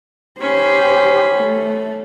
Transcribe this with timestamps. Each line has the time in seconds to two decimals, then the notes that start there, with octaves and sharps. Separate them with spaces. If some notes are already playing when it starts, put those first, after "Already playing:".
0.40 C#4 G4 C5 B5
1.35 A3